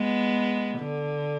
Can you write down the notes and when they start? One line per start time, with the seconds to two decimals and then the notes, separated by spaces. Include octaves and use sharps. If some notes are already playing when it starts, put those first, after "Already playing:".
Already playing: G#3 B3
0.79 D3